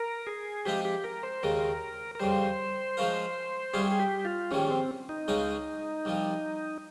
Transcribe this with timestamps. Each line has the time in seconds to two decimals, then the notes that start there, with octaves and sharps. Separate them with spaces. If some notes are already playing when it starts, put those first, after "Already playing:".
Already playing: A#4
0.27 G#4
0.65 C3 F3 G#3 D#4 G4
0.85 G4
1.04 A#4
1.23 C5
1.43 D#2 C#3 G#3 A#4
2.15 A#4
2.19 F2 C#3 G3 C5
2.97 F3 G#3 C#4 F4 A#4
3.73 C2 C3 G3 C#4 F4 G#4
3.91 G#4
3.99 G4
4.25 F4
4.51 A#1 G#2 D#3 G3 C#4
4.71 C4
5.09 D#4
5.28 C#2 C#3 G#3 C#4 G#4
6.05 C2 C3 F3